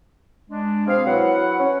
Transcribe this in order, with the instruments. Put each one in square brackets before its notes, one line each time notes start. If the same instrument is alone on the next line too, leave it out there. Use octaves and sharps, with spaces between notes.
[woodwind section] G#3 D4
[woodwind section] B2 G#4 F5 [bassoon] C4
[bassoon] F#3 [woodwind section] E4 B4 F#5
[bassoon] C#4